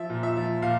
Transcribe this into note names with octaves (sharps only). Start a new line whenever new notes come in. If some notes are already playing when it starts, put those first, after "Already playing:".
Already playing: F3 E5
A#2
E5
F3
A#2 F5